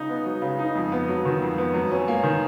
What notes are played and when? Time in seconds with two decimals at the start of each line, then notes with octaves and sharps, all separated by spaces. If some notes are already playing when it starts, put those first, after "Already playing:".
Already playing: C#3 D#4
0.09 B3
0.26 F#3
0.42 C#3
0.59 D#4
0.75 F2
0.92 B3
1.08 F#3
1.25 D#3
1.42 F2
1.58 B3
1.74 F#2
1.91 C#4
2.08 A#3
2.24 D#3